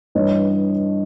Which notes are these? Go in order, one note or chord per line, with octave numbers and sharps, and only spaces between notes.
G2 E3 C#5 D#5